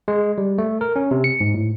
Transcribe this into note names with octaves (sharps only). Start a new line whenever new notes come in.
G#3
G3
A3
A#4
C#4
C3
C#7
G#2
A2